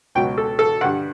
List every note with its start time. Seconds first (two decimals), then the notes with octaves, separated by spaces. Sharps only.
0.15 C#2 B2 F#3 G5
0.38 A4
0.59 A4
0.81 G2 D3 G3 F#5